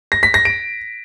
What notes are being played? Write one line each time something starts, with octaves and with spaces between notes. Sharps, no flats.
A#6
B6
A#6
D7